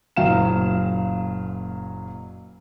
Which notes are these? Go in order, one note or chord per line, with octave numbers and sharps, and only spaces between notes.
F#1 A#2 F#3 F5 F6 E7